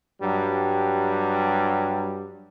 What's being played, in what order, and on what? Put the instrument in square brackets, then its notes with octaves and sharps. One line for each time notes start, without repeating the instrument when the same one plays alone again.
[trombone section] G2 F#3 G3